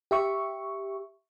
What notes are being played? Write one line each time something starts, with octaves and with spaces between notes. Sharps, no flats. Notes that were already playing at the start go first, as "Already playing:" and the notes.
G4 E5 C#6